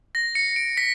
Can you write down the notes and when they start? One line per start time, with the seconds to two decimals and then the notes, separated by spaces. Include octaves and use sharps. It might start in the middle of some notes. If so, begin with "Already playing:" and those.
0.15 A#6
0.35 C#7
0.56 D7
0.77 B6